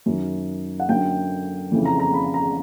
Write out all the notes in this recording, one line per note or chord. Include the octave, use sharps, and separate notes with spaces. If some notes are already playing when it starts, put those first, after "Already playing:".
F#2 D#3
F#5
F#2 D3 G5
F2 C#3 E3
A#5
A#5
B5
A#5